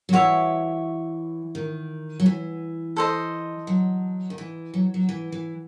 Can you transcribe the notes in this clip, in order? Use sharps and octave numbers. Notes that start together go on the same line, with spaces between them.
F#3
E3 F#4 C#5 E5
D#3
F#3
E3
A4 C5 D#5
F#3
D#3
E3
F#3
F#3
E3
E3